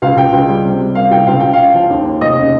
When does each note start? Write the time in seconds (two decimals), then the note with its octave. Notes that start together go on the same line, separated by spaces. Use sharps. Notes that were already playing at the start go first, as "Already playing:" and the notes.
0.02 C#2 F5
0.17 C#2 G5
0.33 C#2
0.49 G3
0.65 C3
0.80 G3
0.95 A#3 F5
1.11 C2 G5
1.27 C#2 F5
1.40 C#2 G5
1.53 F5
1.59 C#3
1.74 F3
1.90 D#2
2.05 D#2
2.21 F1 D#5
2.37 C#3